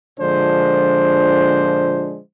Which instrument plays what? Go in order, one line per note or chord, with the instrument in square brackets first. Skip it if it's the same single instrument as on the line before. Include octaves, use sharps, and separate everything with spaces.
[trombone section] A#2 D3 F3 G#3 D4 C5